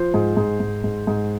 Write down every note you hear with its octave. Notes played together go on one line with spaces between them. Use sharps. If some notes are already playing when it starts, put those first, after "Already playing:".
Already playing: F3 C5
G#2
G#2
G#2
G#2
G#2